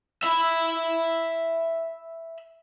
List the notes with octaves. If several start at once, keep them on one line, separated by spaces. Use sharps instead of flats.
E5 B5